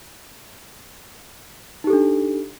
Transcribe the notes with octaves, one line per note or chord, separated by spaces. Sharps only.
D4 D#4 G4 A4